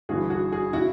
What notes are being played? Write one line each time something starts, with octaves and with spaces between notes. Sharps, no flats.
G1 G2 E3 F#4 G#4
F#4 G#4
F#4 G#4
C#3 E4 F#4